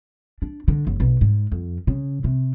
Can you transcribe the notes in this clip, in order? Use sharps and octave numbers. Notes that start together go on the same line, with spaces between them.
D4
D3
F#1
B1
G#2
F2
C#3
C3